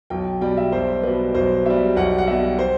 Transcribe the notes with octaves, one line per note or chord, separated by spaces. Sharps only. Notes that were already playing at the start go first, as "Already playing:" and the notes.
B1 G5
B2 G3 G5
E5
B1 C5
B2 G3 B4
B1 C5
B2 G3 E5
B1 F#5
F#5
B2 G3 E5
C5